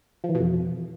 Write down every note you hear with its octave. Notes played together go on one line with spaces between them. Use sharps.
F3
E3
B2
F2